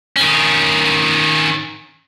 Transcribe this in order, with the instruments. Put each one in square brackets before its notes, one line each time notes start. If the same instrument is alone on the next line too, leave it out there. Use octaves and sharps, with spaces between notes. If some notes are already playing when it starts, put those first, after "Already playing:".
[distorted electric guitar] D#3 C#4